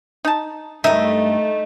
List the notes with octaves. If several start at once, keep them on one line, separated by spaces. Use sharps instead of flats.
D#4 A5
G2 A3 D#4 A#4 E5